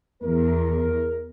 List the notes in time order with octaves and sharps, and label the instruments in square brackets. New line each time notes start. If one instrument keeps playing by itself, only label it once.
[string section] E2 [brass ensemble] A#4